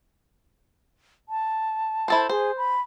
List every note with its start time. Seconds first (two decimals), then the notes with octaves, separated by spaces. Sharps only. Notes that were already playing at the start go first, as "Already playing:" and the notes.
1.29 A5
2.08 E4 A4 C5
2.29 G#4 C5
2.57 B5